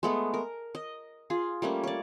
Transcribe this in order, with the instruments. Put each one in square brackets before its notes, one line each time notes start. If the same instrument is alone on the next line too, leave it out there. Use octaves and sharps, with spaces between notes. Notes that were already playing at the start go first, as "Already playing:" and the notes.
[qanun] G#3 A3 B3
A#4
D#5
F4 G#4
G3 A3 A#3 C#4
C#5 D5